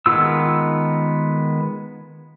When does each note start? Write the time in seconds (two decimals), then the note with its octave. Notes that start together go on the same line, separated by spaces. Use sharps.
0.06 D#3 G#3 B3 F4 E6